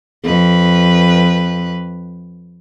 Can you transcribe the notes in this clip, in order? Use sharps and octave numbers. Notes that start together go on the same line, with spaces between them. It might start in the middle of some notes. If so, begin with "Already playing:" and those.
F2 B4